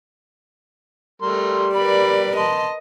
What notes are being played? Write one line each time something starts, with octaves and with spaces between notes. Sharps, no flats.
G3 A3 A#4 C6
A#4 B4 D5 B5
D#5 A5 C6